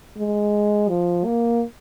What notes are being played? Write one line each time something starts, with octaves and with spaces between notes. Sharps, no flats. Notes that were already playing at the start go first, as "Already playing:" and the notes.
G#3
F3
A#3